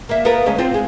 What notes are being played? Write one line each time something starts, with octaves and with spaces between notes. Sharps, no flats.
A#3 E5
B3 F4 A#4
D2 G#3 C#4
C4 F4
G#3